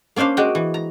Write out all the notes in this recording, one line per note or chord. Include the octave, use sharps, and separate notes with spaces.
A#3 C#4 D4 C5 F5
G#3 F#4 D5 G5
E3
A#5